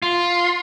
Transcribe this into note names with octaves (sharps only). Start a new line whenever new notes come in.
F4